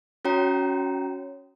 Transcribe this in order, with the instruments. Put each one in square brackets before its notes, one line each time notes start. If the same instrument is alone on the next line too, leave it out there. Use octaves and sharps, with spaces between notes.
[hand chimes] C#4 F#4 C#5 G5 A#5